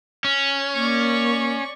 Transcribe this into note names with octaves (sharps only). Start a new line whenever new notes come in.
C#4
A#3 D5 C#6